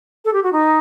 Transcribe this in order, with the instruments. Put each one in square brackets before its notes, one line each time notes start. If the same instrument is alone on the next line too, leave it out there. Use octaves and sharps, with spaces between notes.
[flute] A4
G4
F#4
D#4